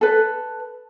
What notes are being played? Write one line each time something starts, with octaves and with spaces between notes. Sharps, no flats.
A4 B4